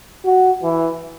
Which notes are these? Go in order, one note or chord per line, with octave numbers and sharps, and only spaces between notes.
F#4
E3